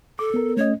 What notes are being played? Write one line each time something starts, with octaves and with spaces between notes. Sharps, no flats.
A4 D6
B3 A#4
A3 C#4 C#5 D#5